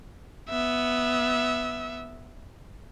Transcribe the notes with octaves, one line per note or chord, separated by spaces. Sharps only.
B3 E5